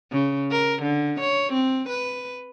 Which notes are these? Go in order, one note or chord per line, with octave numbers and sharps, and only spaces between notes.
C#3
A#4
D3
C#5
C4
B4